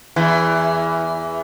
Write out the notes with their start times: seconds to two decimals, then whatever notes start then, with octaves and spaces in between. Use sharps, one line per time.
0.16 E2 E3